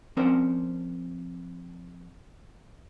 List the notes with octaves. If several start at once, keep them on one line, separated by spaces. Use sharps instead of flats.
F3 C4 C#4 A#4 C5 D5